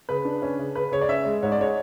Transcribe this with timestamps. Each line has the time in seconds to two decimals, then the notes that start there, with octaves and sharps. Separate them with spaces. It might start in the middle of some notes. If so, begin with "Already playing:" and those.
0.09 C#3 B4
0.25 D4
0.42 C#4
0.59 C#3
0.75 C#3 B4
0.92 C#3 C#5
1.01 D5
1.09 C#4 E5
1.25 G#3
1.43 G#2 C#5
1.52 D5
1.59 G#3 C#5